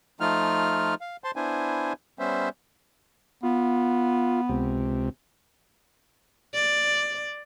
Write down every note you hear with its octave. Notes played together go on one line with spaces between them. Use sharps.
F3 A3 D#4 F4 F6
F5
C5 A5 C6
B3 D4 E4 C5 G#5
G3 B3 C#4 C5 E5
B3 F4
C#2 C3
D5